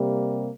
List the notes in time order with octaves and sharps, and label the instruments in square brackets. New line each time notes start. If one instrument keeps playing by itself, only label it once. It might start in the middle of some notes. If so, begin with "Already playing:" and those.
Already playing: [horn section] C3 G3 A#3